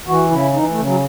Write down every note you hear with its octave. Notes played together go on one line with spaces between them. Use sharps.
E3 F#4
C#3 E4
E3 D#4
A3
C#3
F#3